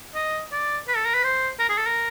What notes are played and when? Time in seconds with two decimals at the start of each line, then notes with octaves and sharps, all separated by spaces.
0.15 D#5
0.52 D5
0.88 B4
0.97 A4
1.05 A#4
1.14 B4
1.24 C5
1.59 A#4
1.69 G#4
1.78 A4
1.86 A#4